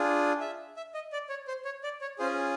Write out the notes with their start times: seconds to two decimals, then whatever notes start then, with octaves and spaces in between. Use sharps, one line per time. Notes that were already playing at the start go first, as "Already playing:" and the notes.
Already playing: D4 F4 G#4
0.40 E5
0.77 E5
0.94 D#5
1.13 D5
1.29 C#5
1.48 C5
1.65 C#5
1.84 D5
2.01 C#5
2.19 C#4 F4 G#4 C5